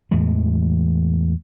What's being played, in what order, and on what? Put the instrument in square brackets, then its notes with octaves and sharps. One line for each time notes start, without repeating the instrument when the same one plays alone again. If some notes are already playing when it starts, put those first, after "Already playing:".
[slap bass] E2 A2 E3 G#3